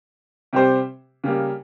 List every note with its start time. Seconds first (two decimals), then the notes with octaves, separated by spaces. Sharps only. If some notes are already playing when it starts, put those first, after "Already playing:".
0.53 C3 G3 C4 G4 C5
1.24 C#3 G3 A#3